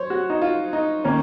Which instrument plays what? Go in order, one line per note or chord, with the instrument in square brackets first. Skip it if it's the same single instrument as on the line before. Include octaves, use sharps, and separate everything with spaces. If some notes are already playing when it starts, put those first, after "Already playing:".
Already playing: [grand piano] F#3 [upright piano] C5 C#5
[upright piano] F#4
D#4
F4
D#4
[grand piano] D#3 A#3 [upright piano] C#4